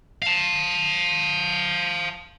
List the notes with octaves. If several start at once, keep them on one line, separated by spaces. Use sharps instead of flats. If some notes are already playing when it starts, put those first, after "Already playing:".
F5 A5